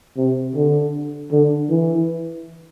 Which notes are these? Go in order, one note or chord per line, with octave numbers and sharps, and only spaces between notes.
C3
D3
D3
E3